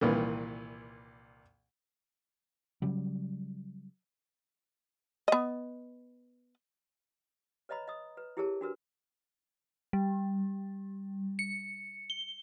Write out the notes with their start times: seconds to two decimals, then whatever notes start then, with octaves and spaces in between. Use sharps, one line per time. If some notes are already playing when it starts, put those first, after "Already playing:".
0.01 C2 A#2 D#3 E3
2.82 C#3 F#3 G3
5.28 B3 D#5
7.69 B4 C#5 D#5 A#5 B5
7.88 D#5 D#6
8.17 B4
8.37 E4 G4 G#4 A#4 C#5 A5
8.61 D4 F#4 A#4 B4
9.93 G3
11.39 C#7
12.10 G7